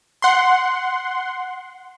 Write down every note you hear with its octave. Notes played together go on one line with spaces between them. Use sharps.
F#5 C6